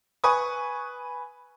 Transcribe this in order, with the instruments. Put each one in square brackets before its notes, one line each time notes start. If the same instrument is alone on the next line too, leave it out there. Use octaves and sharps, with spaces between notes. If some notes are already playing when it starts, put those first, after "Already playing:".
[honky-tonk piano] B4 G#5 C#6 D#6